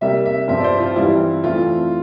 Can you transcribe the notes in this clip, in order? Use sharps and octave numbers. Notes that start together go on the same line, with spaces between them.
C3 G3 A#3 E5
E5
G2 F3 C4 E5
D5
C5
F4
G2 E3 G3 C4 E4
F2 E3 A3 C4 F4